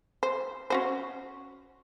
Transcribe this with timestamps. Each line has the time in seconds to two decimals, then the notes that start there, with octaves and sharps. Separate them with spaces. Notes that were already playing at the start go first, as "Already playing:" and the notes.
0.23 C5
0.70 C#4 F#4 C5